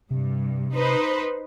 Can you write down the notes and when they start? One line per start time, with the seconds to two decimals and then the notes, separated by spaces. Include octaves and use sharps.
0.11 G2 C3
0.74 D#4 B4 C5